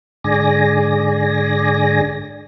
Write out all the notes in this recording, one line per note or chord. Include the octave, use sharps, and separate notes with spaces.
G#2 D3 G#4 D5 G#5 A#6